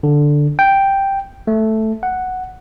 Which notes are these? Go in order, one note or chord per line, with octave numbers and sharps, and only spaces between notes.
D3
G5
A3
F#5